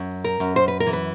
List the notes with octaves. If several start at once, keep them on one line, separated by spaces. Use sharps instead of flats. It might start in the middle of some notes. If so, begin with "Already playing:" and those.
Already playing: F#2
A#4
F#2
C5
B4
A#4
E3
B4